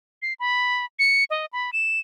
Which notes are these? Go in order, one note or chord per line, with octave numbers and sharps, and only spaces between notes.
C7
B5
C#7
D#5
B5
E7